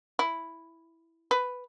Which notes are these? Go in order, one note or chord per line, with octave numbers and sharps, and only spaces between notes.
E4
B4